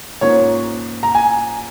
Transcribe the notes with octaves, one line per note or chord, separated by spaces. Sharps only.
G#2 F3 A#3 C#4 C#5
A#5
G#5